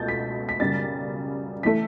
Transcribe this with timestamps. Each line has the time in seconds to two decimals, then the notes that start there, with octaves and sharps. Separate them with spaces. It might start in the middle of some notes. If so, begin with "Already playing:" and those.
Already playing: C#2 B2 A3 G6 A6
0.08 B6
0.49 B6
0.60 F#2 C#3 G3 A6
1.63 E3 A3 B6